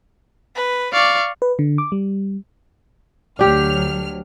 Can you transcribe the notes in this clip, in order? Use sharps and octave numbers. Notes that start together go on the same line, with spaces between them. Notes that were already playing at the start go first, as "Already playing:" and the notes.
B4
D5 F5 C#6
B4
D3
D6
G3
D2 F#3 D4 G4 F6